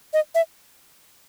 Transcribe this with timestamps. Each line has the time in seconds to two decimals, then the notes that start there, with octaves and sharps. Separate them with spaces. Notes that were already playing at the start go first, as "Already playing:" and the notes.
0.13 D#5
0.35 E5